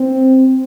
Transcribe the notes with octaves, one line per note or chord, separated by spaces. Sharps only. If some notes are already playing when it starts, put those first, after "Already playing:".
Already playing: C4